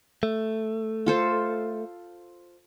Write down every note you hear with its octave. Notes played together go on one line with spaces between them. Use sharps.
A3
F4 A4 C5